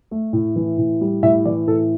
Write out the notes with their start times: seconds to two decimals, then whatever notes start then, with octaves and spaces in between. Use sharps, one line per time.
0.11 A3
0.33 A2
0.56 E3
0.78 A2
1.01 G3
1.23 A2 E5
1.45 E3 D5
1.67 A2 A4